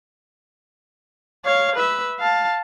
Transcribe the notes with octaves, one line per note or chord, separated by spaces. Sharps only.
C#5 F5
B4 E5
F5 A5